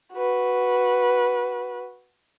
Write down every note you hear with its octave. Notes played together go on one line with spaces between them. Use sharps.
F#4 B4